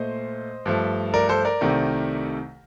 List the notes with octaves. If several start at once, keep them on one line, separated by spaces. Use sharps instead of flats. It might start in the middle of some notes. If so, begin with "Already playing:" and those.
Already playing: A#2 A3 C5 D#5
G2 F3 A3
A#4 D5
A4 C5
A#4 D5
C2 C3 D#3 A3